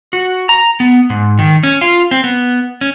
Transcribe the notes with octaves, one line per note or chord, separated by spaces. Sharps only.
F#4
A#5
B3
G#2
D#3
C#4
F4
C4
B3
C#4